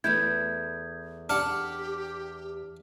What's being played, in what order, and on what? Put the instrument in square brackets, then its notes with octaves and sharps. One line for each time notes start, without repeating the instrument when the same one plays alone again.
[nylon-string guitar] E2 A3 E4 [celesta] G6 G#6
[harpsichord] D4 F#5 [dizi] G4 [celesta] F6